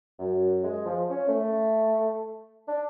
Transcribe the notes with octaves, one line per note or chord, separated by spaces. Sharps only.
F#2
G#3
F3
C#4
A3
D4